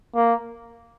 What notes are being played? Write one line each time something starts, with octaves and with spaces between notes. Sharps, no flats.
A#3